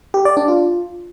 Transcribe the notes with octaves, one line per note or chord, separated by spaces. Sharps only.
G4
D5
D4
F4